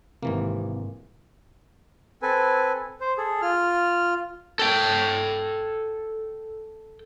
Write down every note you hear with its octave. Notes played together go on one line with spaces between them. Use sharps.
G#1 C3 E3 A#3
C4 A4 B4 G#5
C5
G#4 A4
F4 F6
A4 G5